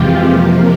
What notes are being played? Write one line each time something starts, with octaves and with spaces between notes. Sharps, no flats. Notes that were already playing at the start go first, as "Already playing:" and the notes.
Already playing: F2 C3 E3 G#3 F4 G4
C3 F3 A#3